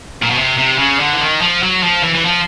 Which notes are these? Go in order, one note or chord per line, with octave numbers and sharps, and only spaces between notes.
A#2
B2
C3
C3
C#3
D3
E3
D#3
F3
F#3
F3
E3
E3
F3